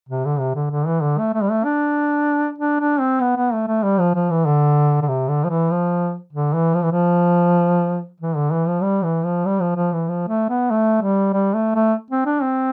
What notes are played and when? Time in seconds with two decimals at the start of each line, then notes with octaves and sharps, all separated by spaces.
0.09 C3
0.25 D3
0.39 C3
0.55 D3
0.71 D3
0.86 E3
1.02 D3
1.18 A3
1.34 A3
1.42 G3
1.50 A3
1.64 D4
2.58 D4
2.80 D4
3.00 C4
3.21 B3
3.36 B3
3.53 A3
3.67 A3
3.83 G3
4.00 F3
4.15 F3
4.30 E3
4.46 D3
5.02 D3
5.08 C3
5.28 D3
5.44 F3
5.49 E3
5.71 F3
6.33 D3
6.53 E3
6.74 F3
6.83 E3
6.91 F3
8.20 E3
8.36 D3
8.51 E3
8.67 F3
8.82 G3
9.03 E3
9.25 F3
9.46 G3
9.61 F3
9.76 F3
9.93 E3
10.08 F3
10.28 A3
10.49 B3
10.70 A3
11.02 G3
11.33 G3
11.54 A3
11.75 A3
12.11 C4
12.26 D4
12.42 C4